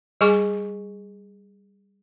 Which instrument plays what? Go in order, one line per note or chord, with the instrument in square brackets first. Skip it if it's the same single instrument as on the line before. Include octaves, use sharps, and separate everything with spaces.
[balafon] G3 G#4 G#5 C#6 D6